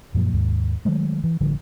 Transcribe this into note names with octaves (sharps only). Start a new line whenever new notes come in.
F#2 A#2 F3
D#2 G#2
D#3 F#3 G#3 A3
E3
A1 D3 F3 G3